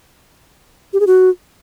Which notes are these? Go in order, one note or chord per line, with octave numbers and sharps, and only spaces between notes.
G4
G#4
F#4